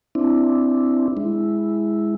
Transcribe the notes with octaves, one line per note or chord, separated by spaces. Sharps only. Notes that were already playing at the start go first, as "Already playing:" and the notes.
C4 D4 E4
G#3 E4